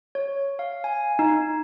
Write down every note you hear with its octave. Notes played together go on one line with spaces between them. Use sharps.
C#5
F5
G#5
D#4